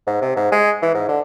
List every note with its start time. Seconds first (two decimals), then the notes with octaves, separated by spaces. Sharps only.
0.07 G#2
0.21 C3
0.36 G#2
0.52 G#3
0.82 E3
0.94 G#2
1.08 D3